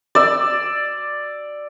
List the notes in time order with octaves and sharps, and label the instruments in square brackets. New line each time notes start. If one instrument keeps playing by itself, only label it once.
[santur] D5 E6